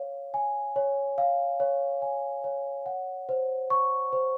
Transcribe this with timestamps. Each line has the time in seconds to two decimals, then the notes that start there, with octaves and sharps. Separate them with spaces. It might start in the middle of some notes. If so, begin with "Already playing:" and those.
Already playing: C#5 F5
0.34 G#5
0.76 C#5
1.18 F5
1.60 C#5
2.02 G#5
2.44 C#5
2.86 F#5
3.29 C5
3.70 C#6
4.13 C5